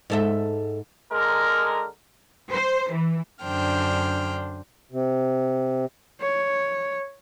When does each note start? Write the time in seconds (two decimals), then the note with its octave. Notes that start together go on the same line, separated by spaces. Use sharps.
0.10 G#2 A4 E5
1.11 D3 G#3 A#4
2.51 C5
2.92 E3
3.44 F#2 D3 D4 C5 G5 F6
4.92 C3
6.21 C#5